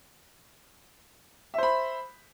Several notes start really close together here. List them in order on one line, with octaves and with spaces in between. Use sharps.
E5 C5 B5